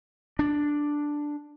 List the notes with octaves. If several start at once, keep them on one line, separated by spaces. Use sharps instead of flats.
D4